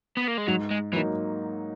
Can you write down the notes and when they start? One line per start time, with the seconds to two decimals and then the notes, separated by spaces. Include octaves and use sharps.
0.17 B3
0.28 A#3
0.38 G#3
0.47 G#2 F#3
0.71 G#3
0.92 E3 F#3 A#3 D#4